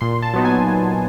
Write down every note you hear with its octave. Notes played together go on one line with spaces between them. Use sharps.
A#2 C6
A5
F#3 B3 D#4
G#5
A#2